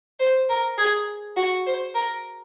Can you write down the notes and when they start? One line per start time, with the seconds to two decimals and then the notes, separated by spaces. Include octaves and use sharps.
0.20 C5
0.49 A#4
0.78 G#4
1.36 F#4
1.67 C5
1.95 A#4